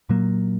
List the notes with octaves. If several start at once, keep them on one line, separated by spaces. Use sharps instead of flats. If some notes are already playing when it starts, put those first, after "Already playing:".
A#2 F#3 A#3